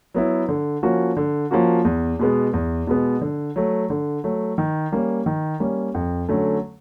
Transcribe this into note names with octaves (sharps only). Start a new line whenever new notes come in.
F#3 B3 E4
D3
F3 A#3 C#4 F#4
D3
F3 A#3 C#4 F#4
E2
B2 G#3 B3
E2
B2 G#3 B3
D3
F#3 A3
D3
F#3 A3
D#3
G3 A#3 C#4
D#3
G3 A#3 C#4
F2
D3 F#3 A3 C#4